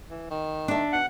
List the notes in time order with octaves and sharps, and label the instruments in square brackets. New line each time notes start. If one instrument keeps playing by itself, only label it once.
[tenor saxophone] E3
D#3
[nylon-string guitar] D4 E5
[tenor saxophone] B2 [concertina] F#5